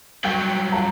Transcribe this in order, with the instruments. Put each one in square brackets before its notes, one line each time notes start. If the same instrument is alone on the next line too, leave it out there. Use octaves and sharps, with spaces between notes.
[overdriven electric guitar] G2 F#3 [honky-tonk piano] G5 G6
[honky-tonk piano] F4 A5 A#5